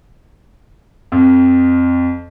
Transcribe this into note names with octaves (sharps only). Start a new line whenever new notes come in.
F2